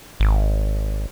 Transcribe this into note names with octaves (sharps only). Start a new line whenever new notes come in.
G#1